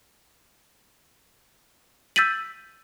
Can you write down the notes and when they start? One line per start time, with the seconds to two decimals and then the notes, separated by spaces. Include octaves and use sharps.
2.16 E6 G6 A6 B6 D#7 F#7